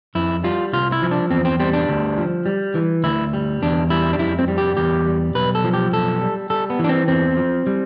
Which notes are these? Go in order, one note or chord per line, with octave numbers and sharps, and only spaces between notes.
F2 E4
G3 F4
C2 F4
E4
F3
D4
E2 C4
C4
G3 C4
D4
D2
F3
G3
E3
D2 E4
G3
E2 D4
G3 E4
D4
F2 E4
C4
G3
G4
E2 G4
G3
B1 B4
A4
F3
G4
B1 A4
G3
G3 A4
B3
E3 D4
C4
E2 C4
F3
G3